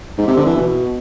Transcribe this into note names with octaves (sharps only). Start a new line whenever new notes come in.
G#2
C3
D3
E3
B2